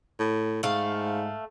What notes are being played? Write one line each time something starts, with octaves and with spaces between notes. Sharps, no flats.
A2
G#2 A3 F5